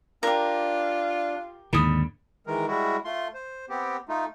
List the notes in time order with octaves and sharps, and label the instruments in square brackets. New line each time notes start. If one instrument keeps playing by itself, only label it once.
[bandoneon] D4 [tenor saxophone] F4 [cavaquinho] G4 A#4
[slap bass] D#2 G#2 D3 [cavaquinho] B5 D#6
[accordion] D#3 E3 G#3 A#4
G3 G#3 E4 F#4
A3 F4 C6
C5
B3 C4 G4
A3 D#4 F4